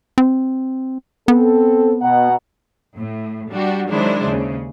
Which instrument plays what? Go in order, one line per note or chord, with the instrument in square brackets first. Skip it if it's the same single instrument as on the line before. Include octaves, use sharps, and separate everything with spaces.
[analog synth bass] C4
[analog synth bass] B3 [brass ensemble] C4 A4
[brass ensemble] B2 F#5 A#5
[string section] A2
G3 D4 F#4 G4
D#3 F#3 G#3 D4 E4 C5
D#2 C#3